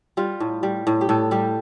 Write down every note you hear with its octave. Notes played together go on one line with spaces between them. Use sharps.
G3 F4
A2
G3
A2
G4
A2 A4
G3 G4